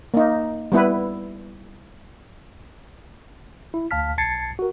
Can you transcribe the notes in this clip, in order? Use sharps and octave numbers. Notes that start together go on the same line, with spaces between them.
A#3 D#4
G3 B3 E4 B4
E4
D2 F5 A5 F6 B6
B1 A5 G#6 A6 C7 C#7
F#4 A#4